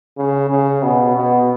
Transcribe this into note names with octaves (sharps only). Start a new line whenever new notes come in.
C#3
C#3
B2
B2